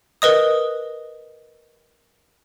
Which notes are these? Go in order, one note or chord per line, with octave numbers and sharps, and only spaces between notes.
A#4 B4 D#5 D#6